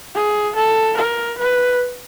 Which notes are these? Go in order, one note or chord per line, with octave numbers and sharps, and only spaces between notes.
G#4
A4
A#4
B4